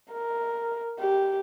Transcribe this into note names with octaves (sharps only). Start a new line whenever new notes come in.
A#4
G4